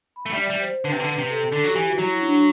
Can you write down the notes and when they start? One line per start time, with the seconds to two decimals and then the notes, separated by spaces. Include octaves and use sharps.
0.16 B5
0.26 A3
0.32 G3 E5
0.39 D5
0.50 G3
0.61 C5
0.84 D3 B4
0.92 C3
1.00 D3
1.07 B4
1.18 C3
1.29 A4
1.52 D3 A4
1.64 F#3
1.70 G4
1.75 E3
1.86 F#4
1.98 F#3 E4
2.21 D4